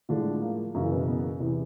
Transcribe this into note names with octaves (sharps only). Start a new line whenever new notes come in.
A2 D3 F3 G#3 D4
A#3
F#2 C#3 E3 A#3
B2 B3
B2 B3
A#3
E2 C3 E3